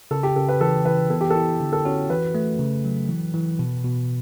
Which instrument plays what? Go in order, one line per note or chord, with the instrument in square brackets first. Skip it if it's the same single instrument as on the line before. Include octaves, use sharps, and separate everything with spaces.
[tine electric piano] C#3 [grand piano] A4
[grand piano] G4
[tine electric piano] C#3 [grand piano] A4
[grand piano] B4
[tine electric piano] E3 [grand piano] A4
[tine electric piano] E3 [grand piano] B4
[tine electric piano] B3 [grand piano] A4
[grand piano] G4
[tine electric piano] E4 [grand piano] A4
[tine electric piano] D3
[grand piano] A4
[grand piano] C#4 [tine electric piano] F#4
[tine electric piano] E3 [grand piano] B4
[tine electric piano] A3
C#3
F#3
E3
E3
B2
B2